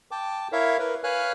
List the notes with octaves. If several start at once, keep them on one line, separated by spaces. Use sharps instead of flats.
G5 A5 D6
E4 A#4 C#5 E5 F5
A#4 B4
B4 C#5 F5 G#5 F6 F#6